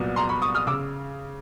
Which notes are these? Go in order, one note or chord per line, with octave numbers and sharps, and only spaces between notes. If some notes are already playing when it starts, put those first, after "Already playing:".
Already playing: C2 A#2 F#3 B3
A#5 C6
B5 C#6
C#6 D#6
D#6 F6
C#3 D6 E6